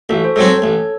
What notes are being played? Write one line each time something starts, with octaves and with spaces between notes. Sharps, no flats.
A1 F#4 A4
C5
G#2 F#3 C4 A4 C#5
A1